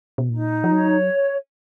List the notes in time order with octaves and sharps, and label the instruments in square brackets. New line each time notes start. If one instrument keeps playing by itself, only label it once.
[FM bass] B2
[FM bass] A#2 [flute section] D#4
[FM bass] F3
[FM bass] F#3 [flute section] C#5